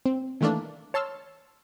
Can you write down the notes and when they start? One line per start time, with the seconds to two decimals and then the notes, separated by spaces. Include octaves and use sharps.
0.06 C4
0.41 D#3 E3 A3 A#3 D4
0.94 C#5 A5 C6 E6 F6